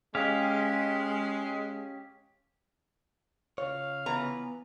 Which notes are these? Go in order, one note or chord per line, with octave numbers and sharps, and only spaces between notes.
G#3 C#4 G4 F5
C#3 F4 C#5 F5
E3 B3 B4 A#5